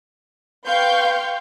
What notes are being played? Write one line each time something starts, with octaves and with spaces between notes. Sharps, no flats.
B4 F5 G5 C6 C#6 G6